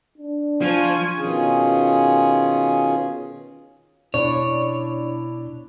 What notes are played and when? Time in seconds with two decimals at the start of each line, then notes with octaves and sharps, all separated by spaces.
0.18 D4
0.62 F3 G#5 C#6
1.19 B2 D#3 C#4 F4 G#4
4.14 B2 B3 C#4 D4 E4 C#5